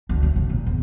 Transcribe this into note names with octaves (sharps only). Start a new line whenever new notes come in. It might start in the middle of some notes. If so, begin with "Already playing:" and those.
D2
C#3
A2
A#2
E2